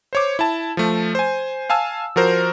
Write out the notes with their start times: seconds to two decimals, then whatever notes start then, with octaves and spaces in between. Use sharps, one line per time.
0.13 C5 C#5 D6
0.39 E4 A5
0.77 F3 A3
1.15 C5 G#5
1.70 F5 G#5 A5 E6
2.16 F3 F#4 A#4 C5